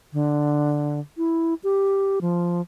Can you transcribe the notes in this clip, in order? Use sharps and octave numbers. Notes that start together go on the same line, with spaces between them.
D3
E4
G4
F3